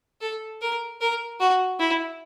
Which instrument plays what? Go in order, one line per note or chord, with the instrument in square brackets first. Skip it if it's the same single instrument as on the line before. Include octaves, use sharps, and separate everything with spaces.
[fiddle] A4
A#4
A#4
F#4
E4